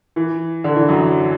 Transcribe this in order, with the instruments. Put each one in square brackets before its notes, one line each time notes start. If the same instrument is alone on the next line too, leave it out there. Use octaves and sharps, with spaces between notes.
[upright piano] E3
D3
E3
F#2 F#3